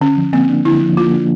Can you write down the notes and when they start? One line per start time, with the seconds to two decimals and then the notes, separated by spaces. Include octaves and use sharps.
0.01 D3 C#4
0.17 F3
0.33 A#3 C4
0.49 D4
0.65 D3 E4
0.81 F3
0.97 A#3 F4
1.13 D4